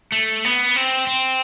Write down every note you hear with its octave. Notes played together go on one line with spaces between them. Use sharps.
A3
B3
C4
C4